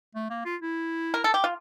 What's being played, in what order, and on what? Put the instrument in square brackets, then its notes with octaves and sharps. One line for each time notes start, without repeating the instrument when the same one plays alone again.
[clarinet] A3
A#3
F4
E4
[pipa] A#4
A4
G4
F4